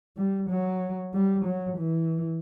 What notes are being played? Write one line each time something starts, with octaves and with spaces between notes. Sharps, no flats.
G3
F#3
G3
F#3
E3